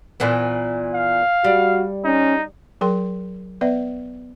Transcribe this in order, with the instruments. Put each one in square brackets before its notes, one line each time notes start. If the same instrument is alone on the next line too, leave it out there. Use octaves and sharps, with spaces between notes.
[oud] A#2 E3 B3
[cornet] F5
[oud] G3 [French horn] F#4
[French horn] C#4 [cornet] D#4
[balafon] F#3 G#4 A#4 G5 C6
B3 B4 D5 E5